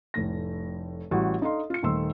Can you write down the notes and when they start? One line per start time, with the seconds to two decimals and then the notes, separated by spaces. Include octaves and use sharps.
0.14 F1 A2 A#6
1.11 A1 G3 F#4
1.41 D4 D#4 A4 D#5 F5 C6
1.70 F4 C#7
1.83 D#1 D#3 A3 C6 E6